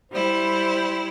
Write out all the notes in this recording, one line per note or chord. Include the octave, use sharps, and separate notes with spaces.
G3 E4 C5